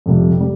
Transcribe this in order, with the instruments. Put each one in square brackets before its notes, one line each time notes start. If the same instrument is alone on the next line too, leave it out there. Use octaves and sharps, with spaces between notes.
[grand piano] F2 C3 G3
C3 G3